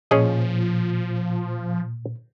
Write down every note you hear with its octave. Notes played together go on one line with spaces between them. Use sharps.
A#2 F3 C#4 G#4 D#5